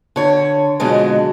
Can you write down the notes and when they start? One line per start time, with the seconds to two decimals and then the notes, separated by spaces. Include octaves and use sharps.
0.16 D3 C#5
0.80 F2 B2 D3 F#3 G#3